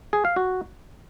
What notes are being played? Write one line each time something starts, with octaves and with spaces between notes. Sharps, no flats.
G#4
F5
F#4